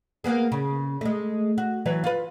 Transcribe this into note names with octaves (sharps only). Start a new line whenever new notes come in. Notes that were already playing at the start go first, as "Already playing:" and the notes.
A#3 B3 G#4
C#3
G#3 A3
F#4
E3 F#3 B4
F4 B4